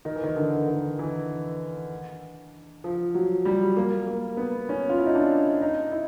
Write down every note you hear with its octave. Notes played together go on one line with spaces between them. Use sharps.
D#3
E3
D#3
D3
D#3
E3
F3
F#3
G3
A#3
A#3
B3
C#4
F4
E4
D#4
D4
D#4
E4